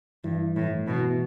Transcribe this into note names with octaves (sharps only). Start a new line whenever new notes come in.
G2 E3
A2
B2 E3